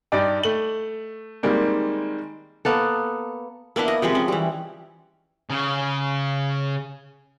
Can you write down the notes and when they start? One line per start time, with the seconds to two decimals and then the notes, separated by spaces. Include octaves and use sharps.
0.12 G2 D#4 G4 D5 G5 D6
0.43 A3 F#7
1.43 D#3 G3 G#3 A#3 C4
2.65 A#3 B3 A4
3.76 A#3 B3 D4 E4
3.88 D#5
4.02 C3 F3 G#3 B4
4.15 C#4
4.28 E3 G3
5.50 C#3 G#4